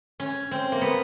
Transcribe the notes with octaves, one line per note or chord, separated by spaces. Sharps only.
C#4
C4
A#3
B3